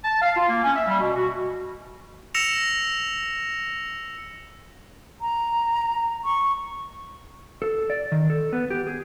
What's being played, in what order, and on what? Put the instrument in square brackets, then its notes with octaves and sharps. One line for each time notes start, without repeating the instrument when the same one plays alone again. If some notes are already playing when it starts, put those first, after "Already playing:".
[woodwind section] A5
F5
F4
A#3
C#4
E5
G3
B2
F#4
[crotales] E6 A#6 C#7 E7 F7
[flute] A#5
C#6
[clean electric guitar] A4
D5
D#3
A4
B3
G4
G#4